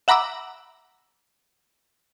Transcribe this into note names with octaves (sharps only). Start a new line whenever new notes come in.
E5 F#5 A#5 B5 D6 E6